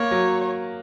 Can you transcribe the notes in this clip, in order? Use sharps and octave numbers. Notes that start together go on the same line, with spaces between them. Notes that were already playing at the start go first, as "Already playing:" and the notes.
Already playing: A#3 C#5
F#3